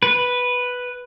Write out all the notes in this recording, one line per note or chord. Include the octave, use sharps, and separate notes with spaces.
B4